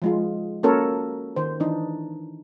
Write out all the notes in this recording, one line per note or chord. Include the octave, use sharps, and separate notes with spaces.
F3 G#3 F4
A#3 C#4 F#4 A4 A#4 C#5
D#3 C5
E3 D4 D#4